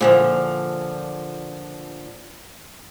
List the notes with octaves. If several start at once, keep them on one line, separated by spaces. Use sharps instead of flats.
A#2 D3 F3